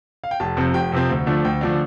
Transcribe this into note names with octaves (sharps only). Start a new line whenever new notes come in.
F5
G5
F1 A5
F2 C3 F3 C4
F1 G5
F2 C3 F3 C4
D2
D3 F3 A3 D4
D2 G5
D3 F3 A3 D4